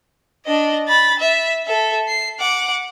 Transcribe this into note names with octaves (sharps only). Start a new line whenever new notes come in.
D4 D#5
B5 A6
E5
A4 E5
C7
F#5 D6